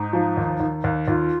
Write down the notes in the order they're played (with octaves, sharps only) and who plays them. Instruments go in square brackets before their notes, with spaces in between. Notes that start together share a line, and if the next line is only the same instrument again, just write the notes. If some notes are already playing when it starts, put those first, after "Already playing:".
Already playing: [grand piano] G#2 [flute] D#4
[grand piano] F3
D#2
D#2
D#2
[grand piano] D#2 [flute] F4